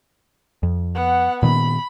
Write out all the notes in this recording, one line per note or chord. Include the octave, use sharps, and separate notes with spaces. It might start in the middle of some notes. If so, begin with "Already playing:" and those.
F2
B3 F#5
A#2 D#3 B3 B5